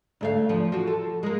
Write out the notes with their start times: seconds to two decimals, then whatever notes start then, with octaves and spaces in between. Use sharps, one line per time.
0.21 D2 A3 F5
0.49 E2 F3
0.72 F3 F#4
0.87 A4
1.23 G#3 A#3